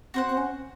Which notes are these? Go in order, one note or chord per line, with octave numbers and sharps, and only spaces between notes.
C4 F#4 C5 F#5
C4
C#4